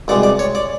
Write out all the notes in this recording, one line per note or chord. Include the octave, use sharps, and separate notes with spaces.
C2 B2 G#3 D5
D5
C#5
D5